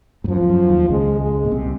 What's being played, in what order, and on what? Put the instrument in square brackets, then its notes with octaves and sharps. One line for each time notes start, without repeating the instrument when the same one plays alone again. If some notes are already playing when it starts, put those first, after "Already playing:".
[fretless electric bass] G#2
[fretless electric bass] F#2 [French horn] F3
[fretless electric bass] F2
F#2
D#2 D#3
[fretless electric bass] C#2 C#3 [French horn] G#3
[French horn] G#3
[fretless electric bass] A#2
C2 C3